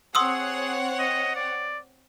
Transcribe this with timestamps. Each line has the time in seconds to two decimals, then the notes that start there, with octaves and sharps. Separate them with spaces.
0.15 C4 G#4 C#5 F#5 C6 D#6 E6
0.99 D#5
1.36 D5